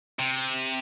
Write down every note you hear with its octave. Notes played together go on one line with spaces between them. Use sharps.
C3